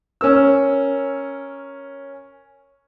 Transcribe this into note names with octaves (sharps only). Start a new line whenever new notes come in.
C#4 A#4 E6